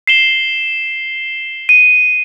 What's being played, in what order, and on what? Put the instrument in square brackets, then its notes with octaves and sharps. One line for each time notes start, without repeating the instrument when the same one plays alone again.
[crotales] C7 E7 G7
D#7